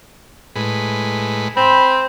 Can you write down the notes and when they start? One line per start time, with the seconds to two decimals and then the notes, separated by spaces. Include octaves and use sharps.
0.56 A2 G#3 B4
1.57 C4 C5 B5